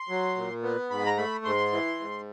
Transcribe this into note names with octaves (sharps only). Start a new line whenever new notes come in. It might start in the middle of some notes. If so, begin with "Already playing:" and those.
Already playing: C6
F#3
A#2
B3
G#2 B5
A#5
A3 B5
G#2 C6
E3
G#2